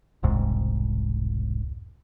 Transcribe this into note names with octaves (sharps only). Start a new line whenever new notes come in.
E1 C2 G#2